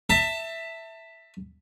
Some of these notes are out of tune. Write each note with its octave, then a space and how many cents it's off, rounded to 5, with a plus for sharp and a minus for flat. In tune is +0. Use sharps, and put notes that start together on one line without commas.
E5 +0 A5 +25